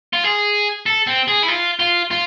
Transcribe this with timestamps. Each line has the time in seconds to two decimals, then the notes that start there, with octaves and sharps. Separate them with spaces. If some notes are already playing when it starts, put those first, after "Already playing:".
0.13 F4
0.24 G#4
0.86 A4
1.07 C4
1.28 G#4
1.43 E4
1.48 F4
1.80 F4
2.11 F4